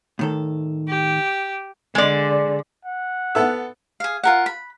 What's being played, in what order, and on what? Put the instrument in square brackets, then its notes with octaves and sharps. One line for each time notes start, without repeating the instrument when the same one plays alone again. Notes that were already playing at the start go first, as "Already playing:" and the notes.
[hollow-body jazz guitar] A2 D#3 A4
[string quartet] G4
[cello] D3 [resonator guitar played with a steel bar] G#3 D5
[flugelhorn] F#5
[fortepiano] B3 A4 E5
[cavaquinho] G#4 F5
F4 A#4 F#5
B5